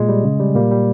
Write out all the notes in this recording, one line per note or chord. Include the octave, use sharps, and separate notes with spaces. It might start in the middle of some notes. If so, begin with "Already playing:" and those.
Already playing: A#2 G#3
G3
C#3
G3
A#2 G3 A#3
G3